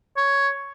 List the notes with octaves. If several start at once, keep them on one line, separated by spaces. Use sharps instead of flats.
C#5